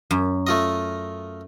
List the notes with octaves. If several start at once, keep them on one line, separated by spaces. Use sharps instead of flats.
F#2
A3 F4 D#5